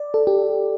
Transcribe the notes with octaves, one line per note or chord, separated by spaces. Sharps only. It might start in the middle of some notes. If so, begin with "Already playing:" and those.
Already playing: D5
A4
G4